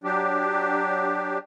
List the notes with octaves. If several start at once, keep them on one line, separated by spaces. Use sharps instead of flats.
F#3 D4 G4